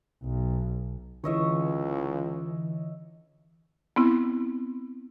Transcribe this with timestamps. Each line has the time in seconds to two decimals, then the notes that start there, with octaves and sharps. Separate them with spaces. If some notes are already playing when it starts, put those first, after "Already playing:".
0.24 B1
1.24 C#2 D3 E3 C#5 D#5 E5
3.96 B3 C4 E4